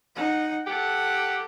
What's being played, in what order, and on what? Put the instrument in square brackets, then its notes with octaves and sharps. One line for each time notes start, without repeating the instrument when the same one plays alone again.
[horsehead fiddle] D#4 F#5
[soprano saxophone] G4 [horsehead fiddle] A4 [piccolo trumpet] F#5